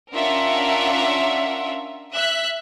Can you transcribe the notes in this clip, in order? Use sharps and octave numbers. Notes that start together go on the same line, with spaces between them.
C#4 D4 F4 A#4 E5 F#5
E5 F#6 B6